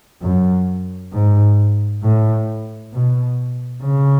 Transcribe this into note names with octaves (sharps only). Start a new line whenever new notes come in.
F#2
G#2
A2
B2
C#3